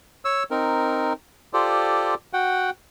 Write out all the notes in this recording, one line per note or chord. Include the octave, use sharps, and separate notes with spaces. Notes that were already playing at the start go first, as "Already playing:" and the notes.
C#5 E6
C4 D#4 A#4
F4 G4 A4 C5 D5
F#4 F#5 G5